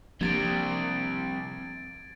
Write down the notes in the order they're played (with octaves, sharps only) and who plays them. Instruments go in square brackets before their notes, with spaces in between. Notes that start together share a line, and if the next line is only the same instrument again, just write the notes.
[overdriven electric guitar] C3 G3 [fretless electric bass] F3 A#3 D4 [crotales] G#6 A6 D7